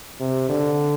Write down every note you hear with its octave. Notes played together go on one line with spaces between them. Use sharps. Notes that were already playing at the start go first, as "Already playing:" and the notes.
C3
D3